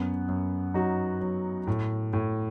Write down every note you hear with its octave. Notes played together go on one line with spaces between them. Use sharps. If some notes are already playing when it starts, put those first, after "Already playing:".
Already playing: F#2 B3
F#2
F#3 D#4 F#4
F#3
A2
A2